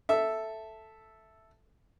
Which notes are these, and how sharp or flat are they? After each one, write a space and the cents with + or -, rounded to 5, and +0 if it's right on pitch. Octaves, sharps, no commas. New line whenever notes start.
A4 +0 E5 +0